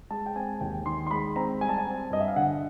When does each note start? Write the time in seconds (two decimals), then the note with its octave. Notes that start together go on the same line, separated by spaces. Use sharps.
0.10 G#3 A5
0.26 G5
0.36 C4 G#5
0.61 D#2 G5
0.86 D#3 C6
1.07 C6
1.11 G#3 B5
1.36 C4 A#5
1.61 G3 G#5
1.69 A5
1.78 G#5
1.86 C4
2.10 G2 D#5
2.21 E5
2.28 F5
2.36 D3 F#5